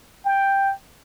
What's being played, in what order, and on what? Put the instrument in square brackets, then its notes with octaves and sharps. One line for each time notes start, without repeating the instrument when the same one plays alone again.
[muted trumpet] G5